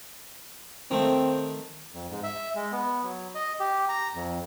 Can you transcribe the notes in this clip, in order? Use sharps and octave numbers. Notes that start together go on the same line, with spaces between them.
D#3 A3 C4
F2
G#2
E5
G#3
B3
F#3
D#5
G4
A#5
F2